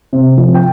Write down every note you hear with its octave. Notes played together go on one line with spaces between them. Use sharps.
C3
F3
G5